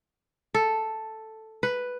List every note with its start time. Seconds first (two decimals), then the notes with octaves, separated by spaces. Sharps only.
0.54 A4
1.63 B4